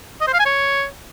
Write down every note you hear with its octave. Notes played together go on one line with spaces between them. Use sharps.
D#5
C5
F5
G#5
C#5